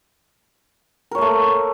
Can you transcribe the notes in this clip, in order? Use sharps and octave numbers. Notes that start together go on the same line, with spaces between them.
A3 A#3 A#4 C#5